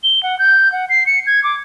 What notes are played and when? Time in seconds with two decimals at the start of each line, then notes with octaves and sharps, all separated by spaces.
0.03 G7
0.23 F#5
0.39 G6
0.72 F#5
0.89 C7
1.06 C#7
1.27 G#6
1.44 D6